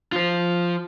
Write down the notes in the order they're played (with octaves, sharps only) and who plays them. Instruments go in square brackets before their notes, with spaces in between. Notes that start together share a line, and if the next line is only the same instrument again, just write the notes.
[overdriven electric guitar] F4 C5